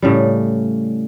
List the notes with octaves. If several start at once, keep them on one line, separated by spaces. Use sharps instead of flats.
A2 C#3 G3